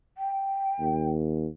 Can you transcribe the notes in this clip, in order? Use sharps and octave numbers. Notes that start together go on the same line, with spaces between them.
G5
D#2